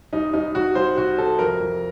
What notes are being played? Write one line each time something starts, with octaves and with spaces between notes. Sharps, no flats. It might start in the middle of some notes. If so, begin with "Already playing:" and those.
C2 D#4
C2 D#4
C2 F#4
C2 C5
C3 F#4
C3 A4
F2 A#4
F2